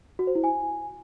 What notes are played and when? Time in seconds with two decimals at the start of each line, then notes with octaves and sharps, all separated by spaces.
0.19 F#4
0.27 C5
0.35 E4
0.44 G#5